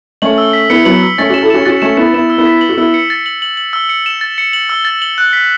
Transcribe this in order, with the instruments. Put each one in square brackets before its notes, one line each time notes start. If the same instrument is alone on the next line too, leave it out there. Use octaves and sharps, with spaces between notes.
[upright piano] A3 C#4 [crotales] F#7
[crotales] E6
B6
[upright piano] B3 E4 [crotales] C#7
[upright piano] F#3 B3 [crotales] F#7
[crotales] E6
[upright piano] A3 C#4 [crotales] A6
[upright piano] C#4 F#4 [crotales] E7
[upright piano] E4 A4
[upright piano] C#4 F#4 [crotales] E7
[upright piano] C#4 F#4 [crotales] A6
[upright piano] A3 C#4 [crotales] E7
[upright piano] B3 E4 [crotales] E7
[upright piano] B3 E4 [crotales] E7
[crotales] E6
[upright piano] B3 E4
[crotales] B6
F#7
[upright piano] F#4
[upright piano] B3 E4 [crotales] E6
[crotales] C#7
A6
F#7
F#7
F#7
E6
C#7
E7
A6
C#7
F#7
E6
A6
F#7
F#6
B6